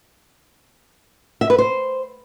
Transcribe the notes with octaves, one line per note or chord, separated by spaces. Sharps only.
E5
B4
C5